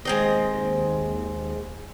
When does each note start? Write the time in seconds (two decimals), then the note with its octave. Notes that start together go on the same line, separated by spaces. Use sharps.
0.05 D#2 G#3 C4 D#5